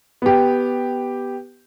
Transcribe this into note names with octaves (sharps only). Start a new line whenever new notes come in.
B3 G4